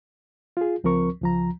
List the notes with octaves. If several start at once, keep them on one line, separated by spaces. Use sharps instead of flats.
F4 G#4
C#2 F3 C4 A#4 C#6
C#2 F3 A#5